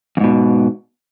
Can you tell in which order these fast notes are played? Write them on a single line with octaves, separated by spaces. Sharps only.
F2 G#2 B2